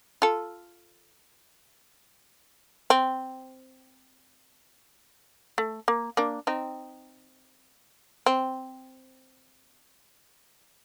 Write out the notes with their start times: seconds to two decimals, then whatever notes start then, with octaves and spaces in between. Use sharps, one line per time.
0.22 F4 A4
2.90 C4
5.58 A3
5.88 A#3
6.17 A#3 D4
6.47 C4 D#4
8.26 C4